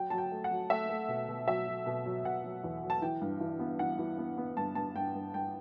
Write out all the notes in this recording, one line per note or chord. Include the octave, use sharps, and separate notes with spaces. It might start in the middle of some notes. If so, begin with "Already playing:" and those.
Already playing: F#3 G5
F#3 A5
G5
A3
F#5
F#3
A3 E5
A3
B2
B2
F#3 E5
F#3
B2
F#3
B2 F#5
F#3
E2
F#3
A5
E3 G5
G2
E3
B3
E3 F#5
E3
B3
B3
G2 A5
G2 A5
G2 G5
G2
G2 G5